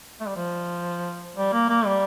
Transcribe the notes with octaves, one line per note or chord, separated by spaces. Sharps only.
A3
G3
F3
G3
A#3
A#3
G3